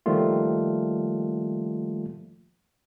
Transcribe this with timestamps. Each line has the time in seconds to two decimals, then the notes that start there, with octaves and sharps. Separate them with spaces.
0.06 D#3 F3 G3 A3 A#3 F4